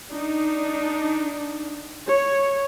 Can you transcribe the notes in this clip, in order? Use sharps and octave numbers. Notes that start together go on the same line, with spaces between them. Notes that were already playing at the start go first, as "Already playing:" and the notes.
D4 D#4
C#5